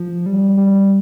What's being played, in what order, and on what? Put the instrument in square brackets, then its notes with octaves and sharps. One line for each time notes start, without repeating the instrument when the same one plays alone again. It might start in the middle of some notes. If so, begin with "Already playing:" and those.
Already playing: [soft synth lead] F3
G3
G3